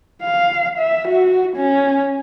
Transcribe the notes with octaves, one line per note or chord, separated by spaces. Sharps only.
F5
E5
F#4
C#4